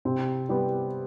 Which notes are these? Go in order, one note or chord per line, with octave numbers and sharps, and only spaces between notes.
C3 C4
G3 B3 G4